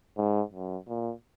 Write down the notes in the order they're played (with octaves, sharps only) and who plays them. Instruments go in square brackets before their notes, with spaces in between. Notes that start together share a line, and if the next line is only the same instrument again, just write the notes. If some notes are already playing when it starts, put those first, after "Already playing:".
[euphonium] G#2
F#2
A#2